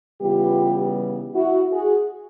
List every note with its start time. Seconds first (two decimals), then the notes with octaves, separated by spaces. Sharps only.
0.21 C#3 E3 G3 B3 F4 G4
1.34 E4 F#4
1.72 F#4 G#4